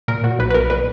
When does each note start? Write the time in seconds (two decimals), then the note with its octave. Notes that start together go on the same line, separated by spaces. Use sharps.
0.08 A#2 A#4
0.24 A#2 F#4
0.39 B1 B4
0.50 B4
0.54 B1 A#4
0.70 A#2 B4